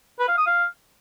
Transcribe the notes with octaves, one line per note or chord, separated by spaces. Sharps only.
B4
F5
D#6
F5